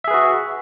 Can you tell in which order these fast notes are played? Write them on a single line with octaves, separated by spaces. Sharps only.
E5 G#4 B4 F#4